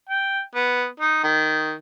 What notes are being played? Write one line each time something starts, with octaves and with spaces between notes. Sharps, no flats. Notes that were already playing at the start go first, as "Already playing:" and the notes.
G5
B3
D#4
D#3